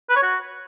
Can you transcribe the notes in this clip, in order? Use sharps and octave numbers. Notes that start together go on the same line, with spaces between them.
B4
C#5
F#4